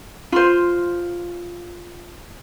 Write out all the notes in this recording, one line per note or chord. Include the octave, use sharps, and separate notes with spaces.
F4 C5